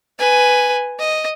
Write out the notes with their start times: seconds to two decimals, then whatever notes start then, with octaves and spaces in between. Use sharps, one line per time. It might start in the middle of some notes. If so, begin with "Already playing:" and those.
0.19 B4 G#5
0.99 D#5